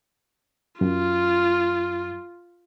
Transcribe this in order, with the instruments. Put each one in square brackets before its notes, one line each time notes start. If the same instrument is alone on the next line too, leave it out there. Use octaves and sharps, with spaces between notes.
[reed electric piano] F#2 [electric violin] F4